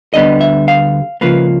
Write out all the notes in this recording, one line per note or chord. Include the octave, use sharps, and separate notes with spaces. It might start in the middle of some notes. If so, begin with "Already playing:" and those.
D2 D3 G3 B3 D#5
E5
F5
C#2 C#3 F3 A#3 B4